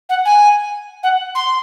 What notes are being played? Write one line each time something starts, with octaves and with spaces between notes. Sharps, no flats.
F#5
G#5
F#5
C6